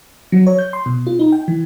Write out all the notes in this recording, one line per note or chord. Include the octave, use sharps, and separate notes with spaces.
F#3
C#5
G6
C6
B2
F4
D#4
G5
E3